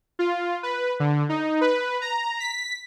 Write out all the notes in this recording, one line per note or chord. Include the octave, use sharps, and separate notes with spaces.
F4
B4
D3
D#4
B4
A#5
B6